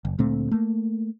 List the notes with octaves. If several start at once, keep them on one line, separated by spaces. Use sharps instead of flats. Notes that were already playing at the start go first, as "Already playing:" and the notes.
F#1
D2 A#2 A3 C4
A3 A#3